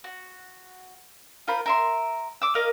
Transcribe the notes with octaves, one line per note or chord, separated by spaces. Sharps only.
F#4
F4 A#4 C5 B5
A#4 E5 C6
D6 E6
A#4 D#5 F5